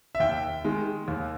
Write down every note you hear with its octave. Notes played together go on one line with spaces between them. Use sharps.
E5
D#2 G5
D#3 G#3
D#2